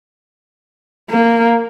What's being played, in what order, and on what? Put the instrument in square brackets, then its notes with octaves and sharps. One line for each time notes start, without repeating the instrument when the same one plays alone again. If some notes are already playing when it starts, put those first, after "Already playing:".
[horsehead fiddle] A#3